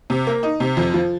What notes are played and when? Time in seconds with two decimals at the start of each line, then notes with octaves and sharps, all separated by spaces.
0.10 C3
0.27 A#3
0.43 D#4
0.60 C3
0.77 F2
0.94 F3